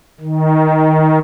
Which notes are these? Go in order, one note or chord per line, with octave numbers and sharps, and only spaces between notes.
D#3